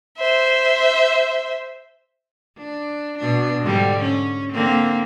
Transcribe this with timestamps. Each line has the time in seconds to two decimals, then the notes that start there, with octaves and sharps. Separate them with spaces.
0.18 C5 E5
2.58 D4
3.19 B2 D4
3.62 G#2 D3 G3
4.02 C#4
4.53 D3 A#3 C4